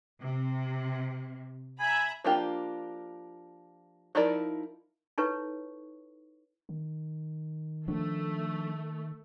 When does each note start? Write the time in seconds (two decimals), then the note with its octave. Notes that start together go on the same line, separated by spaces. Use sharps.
0.22 C3
1.79 E5 G#5 A#5 B5
2.24 F3 A#3 D4 F4 G4
4.15 F3 D#4 E4 A#4 D5
5.18 D#4 E4 A4 B4 C#5 C#6
6.69 D#3
7.88 F3 A3 D4